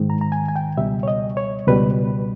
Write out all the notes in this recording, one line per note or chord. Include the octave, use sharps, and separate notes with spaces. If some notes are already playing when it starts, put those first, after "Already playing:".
Already playing: G#2 D#3 G#3
A#5
A#5
G#5
G#5
G5
C#2 B2 G3 E5
C#5
D#5
C#5
C#2 B2 G3 B4